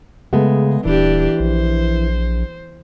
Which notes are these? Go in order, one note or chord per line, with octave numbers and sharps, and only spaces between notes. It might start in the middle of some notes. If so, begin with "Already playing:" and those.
C#3 G#3 A3 B3
D#1 E3 D4 G4
A#1 C5